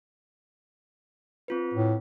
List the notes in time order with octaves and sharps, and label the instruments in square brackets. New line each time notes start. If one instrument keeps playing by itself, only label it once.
[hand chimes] C4 F4 B4
[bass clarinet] A2